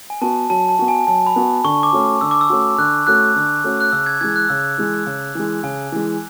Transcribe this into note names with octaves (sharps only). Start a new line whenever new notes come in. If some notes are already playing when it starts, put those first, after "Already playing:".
G#5
B3 F#4 A5
F#3 A5
A5
B3 F#4
G#5
F#3 A5
B5
B3 F#4
D3 C#6
D6
A3 C#4 F#4
D3 E6
D6
E6
A3 C#4 F#4
D3 F#6
A3 C#4 F#4 F#6
D3
A3 C#4 F#4
F#6
C#3 E6
G#6
E3 G#3 G#6
F#6
C#3 E6
E3 G#3
C#3
E3 G#3
C#3 G#5
E3 G#3